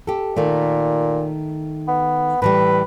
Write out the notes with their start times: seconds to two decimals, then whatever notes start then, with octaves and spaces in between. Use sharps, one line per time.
0.07 G4 A4
0.37 A#2 D#3 A3
1.88 B3
2.42 A2 E3 G3 B4